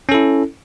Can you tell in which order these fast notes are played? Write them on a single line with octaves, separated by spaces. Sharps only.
C#4 A4 E4